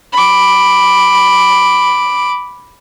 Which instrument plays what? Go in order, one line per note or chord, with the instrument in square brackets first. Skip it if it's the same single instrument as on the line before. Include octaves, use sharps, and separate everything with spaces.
[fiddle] B5 D6